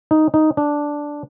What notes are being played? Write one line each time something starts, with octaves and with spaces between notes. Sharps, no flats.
D#4
D#4
D4